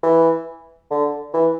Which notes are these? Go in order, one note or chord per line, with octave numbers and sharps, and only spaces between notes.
E3
D3
E3